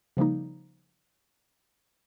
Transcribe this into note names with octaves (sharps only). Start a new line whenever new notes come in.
C#3 F3 G3 A#3 D#4